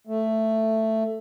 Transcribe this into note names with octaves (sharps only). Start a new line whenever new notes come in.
A3